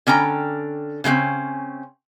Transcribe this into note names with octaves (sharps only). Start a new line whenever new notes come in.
D3 C#4 G5 A#5
C#3 E3 G#3 C4 C#4